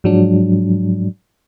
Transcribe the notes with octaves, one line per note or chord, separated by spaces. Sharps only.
G#2 F3 F#3 G#3 D4